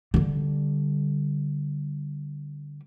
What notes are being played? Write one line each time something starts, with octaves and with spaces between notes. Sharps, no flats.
D3 G3